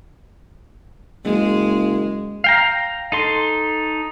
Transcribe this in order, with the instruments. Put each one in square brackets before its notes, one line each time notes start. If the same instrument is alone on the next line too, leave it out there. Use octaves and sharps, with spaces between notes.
[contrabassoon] F#1 [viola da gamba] G#3
[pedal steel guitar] F5 G5 A#5
D#4 A4 C6